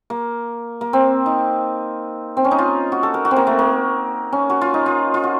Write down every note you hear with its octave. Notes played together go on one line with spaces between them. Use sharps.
A#3
A#3
C4
D#4
C4
C#4
D#4
F4
F#4
A4
A#4
F#4
C4
A#3
A3
A#3
C#4
F#4
F4
D#4
F4
F4
F#4